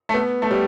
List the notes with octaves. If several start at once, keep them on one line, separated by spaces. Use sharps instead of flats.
A3
B3
A3
G3